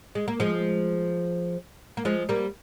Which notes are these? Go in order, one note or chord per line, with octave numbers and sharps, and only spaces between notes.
G#3
A#3
F3 G#3
A#3
F3 G#3
G3 A#3